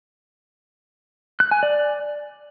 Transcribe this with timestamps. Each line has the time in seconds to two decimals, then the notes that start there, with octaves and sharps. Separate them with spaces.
1.40 F#6
1.51 G#5
1.63 D5